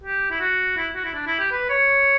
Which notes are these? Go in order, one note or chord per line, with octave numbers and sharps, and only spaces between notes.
G4
E4
F#4
E4
F#4
E4
D4
E4
G4
B4
C#5